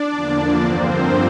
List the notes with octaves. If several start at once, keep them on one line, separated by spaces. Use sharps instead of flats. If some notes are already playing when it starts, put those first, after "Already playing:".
Already playing: D4 D5
E2 D3 F3 A#3
G2 D3 F3 A#3 C4 C5